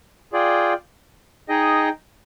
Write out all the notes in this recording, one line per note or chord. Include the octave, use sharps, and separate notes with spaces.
F4 G#4 D5 G5
D#4 G#4 D#5 G5